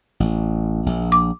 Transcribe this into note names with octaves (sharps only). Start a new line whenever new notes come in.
A1
A#1
D6